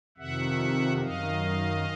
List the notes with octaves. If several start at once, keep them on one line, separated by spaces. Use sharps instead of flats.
F2 C3 D#3 E5 F#5
F#2 D#3 D#5 F5